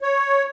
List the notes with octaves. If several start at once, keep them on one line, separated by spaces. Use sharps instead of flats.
C#5